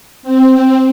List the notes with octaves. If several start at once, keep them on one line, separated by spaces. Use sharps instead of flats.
C4